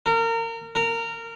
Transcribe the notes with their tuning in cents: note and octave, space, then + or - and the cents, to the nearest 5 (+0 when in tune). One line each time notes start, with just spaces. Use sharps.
A#4 -30
A#4 -20